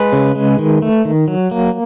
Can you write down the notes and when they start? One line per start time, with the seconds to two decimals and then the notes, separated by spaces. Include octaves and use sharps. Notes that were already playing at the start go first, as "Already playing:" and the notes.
Already playing: G#3 B4
0.13 C#3
0.35 G#3
0.59 D#3
0.82 A3
1.05 D#3
1.28 F#3
1.51 A#3